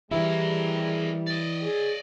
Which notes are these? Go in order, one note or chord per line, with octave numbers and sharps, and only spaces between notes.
E3 G3 G#3 E4 A#4
D5 D#5
G#4